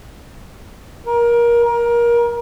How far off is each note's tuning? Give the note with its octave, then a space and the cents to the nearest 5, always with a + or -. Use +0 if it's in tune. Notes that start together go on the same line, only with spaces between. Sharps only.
A#4 +25
A#4 +25